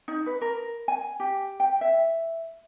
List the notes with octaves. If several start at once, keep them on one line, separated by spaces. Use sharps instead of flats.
D#4
B4
A#4
G#5
G4
G5
E5